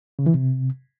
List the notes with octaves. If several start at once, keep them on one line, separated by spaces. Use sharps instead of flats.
C#3
E3
C3